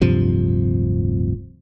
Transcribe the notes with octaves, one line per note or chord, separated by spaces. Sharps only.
D1 G2 C3 F3